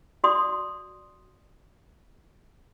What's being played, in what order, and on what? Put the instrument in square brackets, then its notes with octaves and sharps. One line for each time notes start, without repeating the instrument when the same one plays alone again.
[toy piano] F#4 D5 C6 D#6